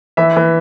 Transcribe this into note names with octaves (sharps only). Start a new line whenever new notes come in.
E3 E5
E3